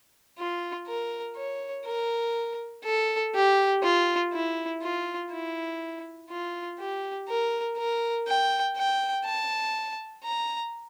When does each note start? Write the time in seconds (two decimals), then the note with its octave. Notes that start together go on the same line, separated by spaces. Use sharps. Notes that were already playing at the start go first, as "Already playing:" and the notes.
0.39 F4
0.87 A#4
1.37 C#5
1.86 A#4
2.85 A4
3.35 G4
3.83 F4
4.33 E4
4.82 F4
5.31 E4
6.30 F4
6.79 G4
7.29 A#4
7.78 A#4
8.27 G5
8.77 G5
9.25 A5
10.24 A#5